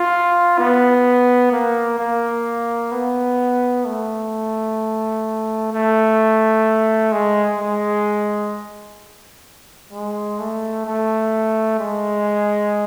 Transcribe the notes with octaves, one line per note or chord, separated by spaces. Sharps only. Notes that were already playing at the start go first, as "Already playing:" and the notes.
Already playing: F4
B3
A#3
A#3
B3
A3
A3
G#3
G#3
G#3
A3
A3
G#3